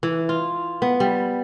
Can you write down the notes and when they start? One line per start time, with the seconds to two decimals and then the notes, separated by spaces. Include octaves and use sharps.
0.03 E3
0.29 F4
0.82 B3
1.00 G3